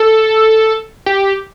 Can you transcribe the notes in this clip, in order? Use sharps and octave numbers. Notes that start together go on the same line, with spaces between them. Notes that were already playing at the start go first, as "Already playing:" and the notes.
Already playing: A4
G4